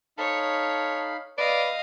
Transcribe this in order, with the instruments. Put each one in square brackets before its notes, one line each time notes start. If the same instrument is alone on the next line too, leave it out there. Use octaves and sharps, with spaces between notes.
[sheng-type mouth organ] D#4 F5 B5 [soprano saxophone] A4 [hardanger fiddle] C#5
[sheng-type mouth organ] B4 [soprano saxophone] D5 [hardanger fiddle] D#5 F5